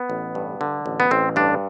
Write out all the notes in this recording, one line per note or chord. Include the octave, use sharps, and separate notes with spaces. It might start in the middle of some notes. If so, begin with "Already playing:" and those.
Already playing: B3
A1
G2
D3
A1
B3
A1 C4
G2 D4